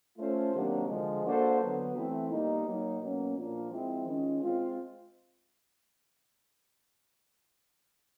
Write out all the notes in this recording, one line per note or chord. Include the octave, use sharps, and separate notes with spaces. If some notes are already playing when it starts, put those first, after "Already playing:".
A3 C#4 F4 A4 C5
C3 D#3 F#3 A#3 D4
D3 F3 G#3
A#3 D4 F#4 A4 C5
D3 F#3 B3
E3 A3 C4 E4
B2 G3 A#3 D#4
F#3 A#3 D#4
B2 F#3 A#3 C#4
A#2 F3 A#3 D4 F4
F3 G#3 C4 E4
D#3 G#3 C#4 F4
G#3 C4 F4